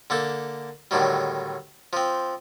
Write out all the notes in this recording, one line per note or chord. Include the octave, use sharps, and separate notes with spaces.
D3 A#3 A4
A2 D3 D#3 F#3 G3
F3 C4